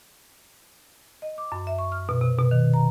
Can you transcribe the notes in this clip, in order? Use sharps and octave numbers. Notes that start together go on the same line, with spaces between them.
D#5
D6
F#2
E5
C#6
F6
B2
C3
B2
D#3
A#5